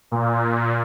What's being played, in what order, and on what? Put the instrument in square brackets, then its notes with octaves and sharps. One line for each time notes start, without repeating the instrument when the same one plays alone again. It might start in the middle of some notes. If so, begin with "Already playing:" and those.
[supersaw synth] A#2